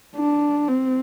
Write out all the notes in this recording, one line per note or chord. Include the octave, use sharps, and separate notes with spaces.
D4
C4